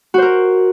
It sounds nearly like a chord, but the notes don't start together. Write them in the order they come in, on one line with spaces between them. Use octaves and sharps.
F#4 C5 A#4